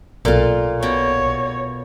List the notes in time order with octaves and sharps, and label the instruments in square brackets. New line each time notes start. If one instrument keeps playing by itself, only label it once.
[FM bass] B1 [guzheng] A#2 F4 [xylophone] A4 A#4 D5
[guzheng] B2 [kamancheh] C#5